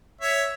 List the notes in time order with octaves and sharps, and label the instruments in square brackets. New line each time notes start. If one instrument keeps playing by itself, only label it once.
[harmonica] C#5 E5